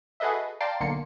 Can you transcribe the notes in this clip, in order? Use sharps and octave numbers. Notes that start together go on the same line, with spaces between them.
F#4 G#4 A4 B4 D#5 E5
D5 F5 G5 A5 A#5 C6
B1 D3 A#3 C6 C#7